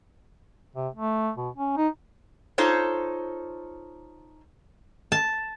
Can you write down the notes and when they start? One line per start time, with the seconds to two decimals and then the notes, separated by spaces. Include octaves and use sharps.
0.76 C3
0.95 A3
1.37 B2
1.57 C#4
1.77 D#4
2.58 D#4 F4 A4 C5 C#5
5.12 A5